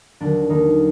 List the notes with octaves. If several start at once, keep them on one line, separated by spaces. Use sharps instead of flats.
D#2 D3 F#3 D4
D#2 D3 F#3 D#4